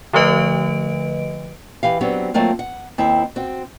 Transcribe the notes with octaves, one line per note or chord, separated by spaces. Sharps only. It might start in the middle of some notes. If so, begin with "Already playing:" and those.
D3 F3 A3 B4 D#5 D7
E3 G4 F5
F#3 B3 C4 D4 G4 B4
F#3 A3 A#3 C4 F4
F#5
D#2 C4 E4
C4 F#4